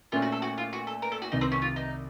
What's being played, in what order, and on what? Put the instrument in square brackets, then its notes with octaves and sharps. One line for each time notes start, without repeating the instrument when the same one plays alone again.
[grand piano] A#2 A3 C#4 [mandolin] F4
[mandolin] F#4
A4
F#4
F4
F#4
A4
A#4
A4
F#4
[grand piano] C2 C3 D#3 [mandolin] D#4
[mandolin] C4
C#4
F4
D#4